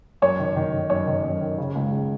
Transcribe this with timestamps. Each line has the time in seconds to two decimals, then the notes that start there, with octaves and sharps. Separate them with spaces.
0.22 F#2 C#5
0.39 D#3
0.56 D#3
0.73 D#3
0.90 F#2 C#5
1.07 D#3
1.24 F#2
1.41 D#3
1.58 C#3
1.75 C#2
1.92 C#3